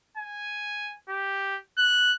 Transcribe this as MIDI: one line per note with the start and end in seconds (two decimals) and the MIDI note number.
0.17 0.94 80
1.09 1.57 67
1.78 2.12 90